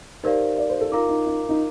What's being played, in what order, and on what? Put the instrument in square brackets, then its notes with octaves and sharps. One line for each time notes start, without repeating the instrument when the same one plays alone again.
[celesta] D#4 G4 A#4 D5 F5 [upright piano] C5
[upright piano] D5
C5
A4
[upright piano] D#4 [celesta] F4 A#4 F5 A#5 D6
[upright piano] D#4
D#4
D#4